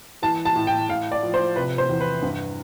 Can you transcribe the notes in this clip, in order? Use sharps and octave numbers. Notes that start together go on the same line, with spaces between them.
E3 A5
A5
A2
G5
A2 F5
D5
F3
C5
C3 B4
C5
E2
B4
G2